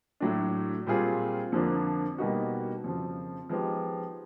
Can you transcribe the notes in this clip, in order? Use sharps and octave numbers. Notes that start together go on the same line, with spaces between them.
A2 F#3 A3 D4
A#2 G3 C4 F4 G#4
F2 D3 F3 A#3 D4
B2 G3 A#3 D#4 F#4
F2 C#3 F3
F3 G#3 B3 D#4 G4